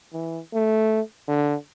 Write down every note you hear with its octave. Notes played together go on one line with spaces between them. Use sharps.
E3
A3
D3